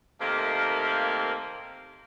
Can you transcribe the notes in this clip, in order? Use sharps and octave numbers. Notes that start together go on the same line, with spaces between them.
C3 D#3 A3 A#3